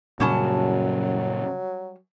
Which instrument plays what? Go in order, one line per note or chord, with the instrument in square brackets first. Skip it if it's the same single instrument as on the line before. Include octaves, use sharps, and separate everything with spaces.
[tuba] F#2 [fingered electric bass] A#2 C#3 [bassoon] F#3 [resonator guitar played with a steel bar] G3 C#4 A5